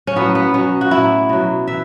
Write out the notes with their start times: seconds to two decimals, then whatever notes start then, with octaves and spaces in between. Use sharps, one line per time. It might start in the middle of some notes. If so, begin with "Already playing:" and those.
0.07 C#4
0.16 A2 F#3 B3
0.35 B3
0.54 B2 F#3 C#4
0.81 F#4
0.91 A2 F#3 E4
1.29 B2 F#3
1.68 E3 E5